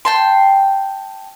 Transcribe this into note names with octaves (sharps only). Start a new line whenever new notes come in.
G5 A5 C6